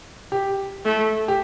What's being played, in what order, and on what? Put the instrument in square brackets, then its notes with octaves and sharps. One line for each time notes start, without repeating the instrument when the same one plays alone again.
[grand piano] G4
[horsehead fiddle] A3
[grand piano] G4